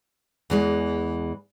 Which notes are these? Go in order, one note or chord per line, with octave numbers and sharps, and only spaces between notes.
E2 E3 G#3